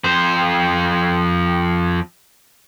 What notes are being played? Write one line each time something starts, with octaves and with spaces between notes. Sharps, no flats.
F2 C5